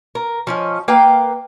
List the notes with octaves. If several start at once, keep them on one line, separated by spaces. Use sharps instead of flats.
A#4
F3 C#4 D#5
A#3 B4 F5 G5